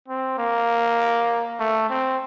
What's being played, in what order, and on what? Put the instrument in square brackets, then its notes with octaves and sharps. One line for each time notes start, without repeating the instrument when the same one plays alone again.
[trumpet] C4
A#3
A3
C4